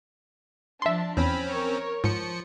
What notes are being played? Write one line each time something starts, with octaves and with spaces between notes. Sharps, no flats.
F3 D4 E5 A5 C6
E2 C4 C#4 B5
A#4 C#5
G#2 F3 C#7